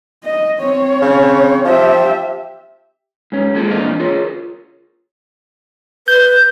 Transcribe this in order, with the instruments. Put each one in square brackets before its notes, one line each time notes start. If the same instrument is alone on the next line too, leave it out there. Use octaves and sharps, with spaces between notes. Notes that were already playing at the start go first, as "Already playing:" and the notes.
[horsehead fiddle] D#5
C4 C#5
[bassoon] C#3
[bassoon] F3 [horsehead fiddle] G4 E5
[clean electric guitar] G#2 C#4
G#3 A#3 F4 G#4 A4
A#2 E3 C4 D4 D#5 F5
F4 G#4 A#4 C#5
[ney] B4 [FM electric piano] G6